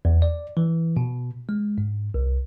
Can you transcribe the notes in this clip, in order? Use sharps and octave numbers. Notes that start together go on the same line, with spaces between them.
E2
D5
E3
B2
G#3
G#2
C2